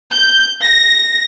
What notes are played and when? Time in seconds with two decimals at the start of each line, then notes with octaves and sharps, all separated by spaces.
0.13 G6
0.63 A#6